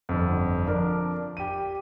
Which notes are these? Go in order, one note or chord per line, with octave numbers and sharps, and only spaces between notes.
G1 F2
F3 D4 A#4
G4 D#7